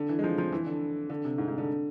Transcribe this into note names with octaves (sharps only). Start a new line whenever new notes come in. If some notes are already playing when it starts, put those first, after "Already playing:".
Already playing: D3
E3
G#3
F3
F3
E3
D3
D3
C3
G#2
G#2
D3